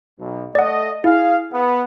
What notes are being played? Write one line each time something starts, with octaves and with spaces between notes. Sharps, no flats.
B1
A3 D5 D#5 F#5
E4 G#4 F5
B3